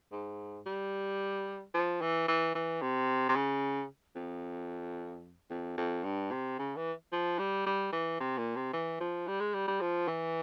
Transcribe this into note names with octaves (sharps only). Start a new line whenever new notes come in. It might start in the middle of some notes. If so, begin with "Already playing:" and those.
G#2
G3
F3
E3
E3
E3
C3
C3
C#3
F2
F2
F2
G2
C3
C#3
E3
F3
G3
G3
E3
C3
A#2
C3
E3
F3
G3
G#3
G3
G3
F3
E3